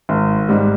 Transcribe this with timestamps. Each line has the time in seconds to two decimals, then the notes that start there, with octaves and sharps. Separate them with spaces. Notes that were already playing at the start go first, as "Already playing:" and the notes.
0.09 G#1
0.49 G#2 G3